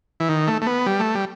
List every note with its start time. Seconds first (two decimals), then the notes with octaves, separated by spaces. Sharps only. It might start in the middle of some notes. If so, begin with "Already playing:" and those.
0.20 E3
0.29 D#3
0.48 A3
0.62 A3
0.67 B3
0.86 G3
1.00 A3
1.15 G3